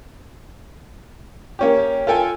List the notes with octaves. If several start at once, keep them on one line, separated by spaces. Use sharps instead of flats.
A#3 C#4 G4
F4 A4 G5 G#5